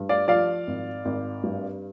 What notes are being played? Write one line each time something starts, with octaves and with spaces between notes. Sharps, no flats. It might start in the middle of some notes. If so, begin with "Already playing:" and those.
Already playing: G2
D5 F5
F3 D5 F5
G#1
G#1
G2